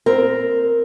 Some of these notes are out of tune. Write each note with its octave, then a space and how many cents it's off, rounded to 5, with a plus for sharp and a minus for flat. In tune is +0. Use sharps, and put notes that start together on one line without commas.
C4 +0 A#4 +0